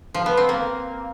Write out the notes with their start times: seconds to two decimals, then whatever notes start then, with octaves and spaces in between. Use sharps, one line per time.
0.14 F3
0.26 B3
0.37 C4
0.49 A#3